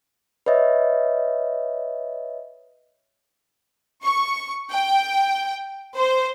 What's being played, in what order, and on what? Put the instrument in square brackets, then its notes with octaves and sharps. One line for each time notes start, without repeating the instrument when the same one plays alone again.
[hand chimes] B4 C#5 D#5 E5
[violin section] C#6
G5
C5